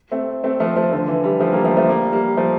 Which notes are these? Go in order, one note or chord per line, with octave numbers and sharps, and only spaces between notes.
A3 C4
A3 C4
F3 A3
F3 A3
D3 F3
E3
E3 G3
F3 A3
G3 A#3
F3 A3
F3 A3
G3 A#3
G3 A#3
F3 A3